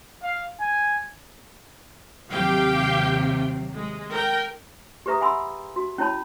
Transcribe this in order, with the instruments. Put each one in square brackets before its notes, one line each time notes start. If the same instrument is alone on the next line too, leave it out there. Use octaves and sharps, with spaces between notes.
[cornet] F5
G#5
[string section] D#2 C3 F#3 [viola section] G4 F5 G5
[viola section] G#3
A#4 G5
[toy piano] G4 G#4 B4 E5 A#5 D#6
E5 F#5 G#5 B5 C6 E6
F#4
C#4 E4 C#5 A5 B5